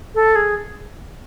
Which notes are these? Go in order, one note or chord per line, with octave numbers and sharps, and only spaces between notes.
A4
G#4